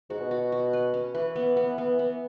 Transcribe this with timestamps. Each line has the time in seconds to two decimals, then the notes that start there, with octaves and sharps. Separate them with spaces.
0.10 G#2 F#4
0.20 B2
0.31 F#4
0.52 F#4
0.73 B4
0.94 C#4
1.14 E3 B4
1.36 B3
1.56 B3
1.78 B3
1.99 B3